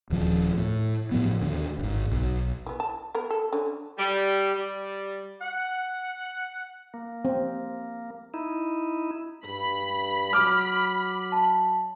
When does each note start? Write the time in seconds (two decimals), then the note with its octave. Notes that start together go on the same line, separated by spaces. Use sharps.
0.10 D#1 D#2 F3
0.57 A2
1.11 A2 F3 B3
1.42 D#2 D3
1.79 D#1 G#1
2.11 B1
2.66 E3 B3
2.80 A5
3.15 B3 A#4
3.30 A4
3.52 D3 C#4
3.98 G3
4.54 G3
5.41 F#5
6.94 A#3
7.25 C4
8.34 D#4 E4
9.45 G2 B5
10.33 F#3 D6 F6
11.32 A5